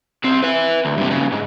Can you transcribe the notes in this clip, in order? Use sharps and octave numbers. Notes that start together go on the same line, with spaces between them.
C2 C4
B4 E5
D2
G2 C3
G2 C#3
G#2